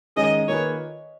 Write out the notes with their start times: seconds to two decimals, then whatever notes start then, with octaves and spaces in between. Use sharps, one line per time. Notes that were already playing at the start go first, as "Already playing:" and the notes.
0.16 D#3 G#3 C#4 G#4 D#5
0.48 D#3 A#3 F4 G#4 B4 C#5